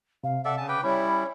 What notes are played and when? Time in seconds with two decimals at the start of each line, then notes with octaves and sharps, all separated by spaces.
0.24 C3 F5
0.45 A4 D5 E5 F#5
0.57 C#3 G#5 A5
0.69 B4 G5 D6
0.84 G3 C#4 E4 C#5 B5